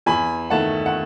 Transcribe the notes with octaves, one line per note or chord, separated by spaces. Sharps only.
E2 G#5 B5
D#3 A3 F#5 A5
F#5